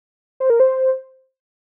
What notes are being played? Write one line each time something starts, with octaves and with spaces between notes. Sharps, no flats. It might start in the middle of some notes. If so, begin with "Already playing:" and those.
C5
A#4
C5